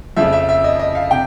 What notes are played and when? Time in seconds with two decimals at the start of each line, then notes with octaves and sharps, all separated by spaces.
0.16 F2 C#3 F3 E5
0.33 E5
0.49 E5
0.64 D#5
0.79 D#5
0.95 F5
1.11 C3 G5